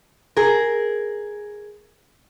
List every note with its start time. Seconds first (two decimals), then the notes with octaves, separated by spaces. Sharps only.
0.36 G#4 A#4